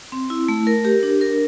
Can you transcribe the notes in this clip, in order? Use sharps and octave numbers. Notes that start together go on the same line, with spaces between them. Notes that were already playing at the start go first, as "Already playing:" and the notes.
C4
E4
A3
A#4
G4
D4
A#4